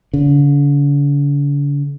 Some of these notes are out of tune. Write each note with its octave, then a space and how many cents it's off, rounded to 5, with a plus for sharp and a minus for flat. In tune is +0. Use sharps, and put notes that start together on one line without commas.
D3 -45